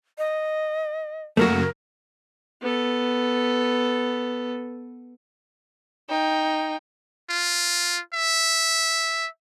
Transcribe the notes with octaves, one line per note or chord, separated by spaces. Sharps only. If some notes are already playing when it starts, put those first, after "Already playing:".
D#5
F#2 C#3 F#3 A3 A#3 F#4 A#4
B3 A4
D#4 G5
F4
E5